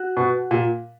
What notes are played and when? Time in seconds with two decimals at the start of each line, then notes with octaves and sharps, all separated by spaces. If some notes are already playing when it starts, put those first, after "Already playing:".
Already playing: F#4
0.17 B2
0.51 A#2